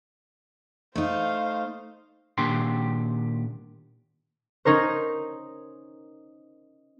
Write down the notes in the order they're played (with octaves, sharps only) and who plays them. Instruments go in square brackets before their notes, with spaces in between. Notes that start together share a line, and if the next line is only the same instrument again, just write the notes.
[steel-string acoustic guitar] A3 D#4 [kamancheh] C5 F5
[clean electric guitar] A#2 D#3 D4 G4 G5 C6
[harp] C#4 D#4 A#4 C5